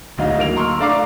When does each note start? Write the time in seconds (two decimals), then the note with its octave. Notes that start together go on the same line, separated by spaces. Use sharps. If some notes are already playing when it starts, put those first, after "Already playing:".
0.17 D1 D2 F#3 D#4 F5
0.39 A#3 D7 F7
0.56 A#5 C6 C#6 E6 F6
0.80 A3 D4 F5 A#5 D6 C7